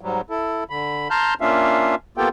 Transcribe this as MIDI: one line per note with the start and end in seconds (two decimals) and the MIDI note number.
0.01 0.21 44
0.01 0.21 54
0.01 0.21 55
0.30 0.64 64
0.30 0.64 69
0.70 1.08 50
0.70 1.08 83
1.10 1.34 81
1.10 1.34 82
1.10 1.34 84
1.10 1.34 89
1.10 1.34 91
1.41 1.95 58
1.41 1.95 61
1.41 1.95 62
1.41 1.95 65
1.41 1.95 76
1.41 1.95 77
2.17 2.29 58
2.17 2.29 59
2.17 2.29 65
2.17 2.29 67
2.17 2.29 69
2.17 2.29 79